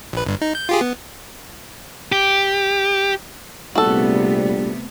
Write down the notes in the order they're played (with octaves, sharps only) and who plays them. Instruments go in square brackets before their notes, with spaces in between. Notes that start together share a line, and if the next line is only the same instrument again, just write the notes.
[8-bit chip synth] A#1 B4
G1 G2
D#4
G6
F4 G4 G#4
B3
[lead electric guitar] G4
[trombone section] A#1 G3 [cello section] C3 A3 B3 [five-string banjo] F#4 A4